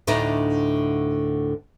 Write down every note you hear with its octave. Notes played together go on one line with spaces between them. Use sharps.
D2 A2 D3 D4 D#4